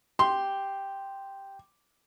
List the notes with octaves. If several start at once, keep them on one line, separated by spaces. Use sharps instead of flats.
G4 C6